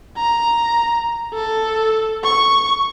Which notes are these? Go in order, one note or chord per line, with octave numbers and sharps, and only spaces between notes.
A#5
A4
C#6